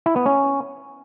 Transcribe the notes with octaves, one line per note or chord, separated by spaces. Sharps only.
E4
B3
C#4